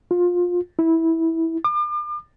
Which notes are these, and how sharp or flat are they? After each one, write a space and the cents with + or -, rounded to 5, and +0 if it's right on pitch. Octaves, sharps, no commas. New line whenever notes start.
F4 +20
E4 -15
D6 +40